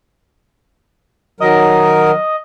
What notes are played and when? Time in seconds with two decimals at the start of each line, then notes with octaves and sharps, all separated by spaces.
1.40 D#3 F#3 A#4 D#5